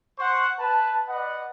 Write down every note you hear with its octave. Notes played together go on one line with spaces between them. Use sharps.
C5 F#5 C#6
B4 A5
B4 D5 D#5 F#5